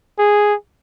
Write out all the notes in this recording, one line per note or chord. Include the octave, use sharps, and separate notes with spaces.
G#4